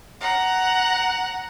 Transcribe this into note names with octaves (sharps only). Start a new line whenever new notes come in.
F#5 A#5